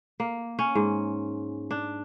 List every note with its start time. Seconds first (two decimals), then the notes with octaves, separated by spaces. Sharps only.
0.20 A#3
0.59 C#4
0.75 G#2
1.71 D4